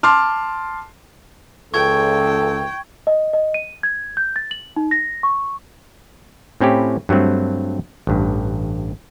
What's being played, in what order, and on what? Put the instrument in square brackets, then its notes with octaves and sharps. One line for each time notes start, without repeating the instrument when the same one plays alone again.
[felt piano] A5 C6 D6 F6
[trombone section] C#2 [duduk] A4 [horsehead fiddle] G5 [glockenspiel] C#6 G#6
[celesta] D#5
D#5
D#7
G#6
G6
A6
F#7
D#4
A#6
C#6
[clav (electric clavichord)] A2 C4 C#4 E4 G4
G2 F#3 A3 C4
A1 G2